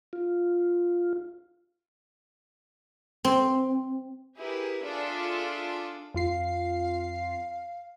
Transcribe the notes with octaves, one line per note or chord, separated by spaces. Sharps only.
F4
C4
E4 G4 G#4 A#4 B4
D4 F4 G#4 A4 D5 E5
F2 F4 F5 C7